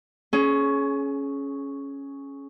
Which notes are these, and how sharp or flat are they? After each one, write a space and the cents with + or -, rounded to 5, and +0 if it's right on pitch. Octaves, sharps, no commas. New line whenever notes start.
C#4 +0 G#4 +30